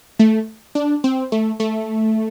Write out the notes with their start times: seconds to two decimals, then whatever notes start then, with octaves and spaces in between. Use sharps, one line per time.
0.19 A3
0.75 D4
1.04 C4
1.32 A3
1.60 A3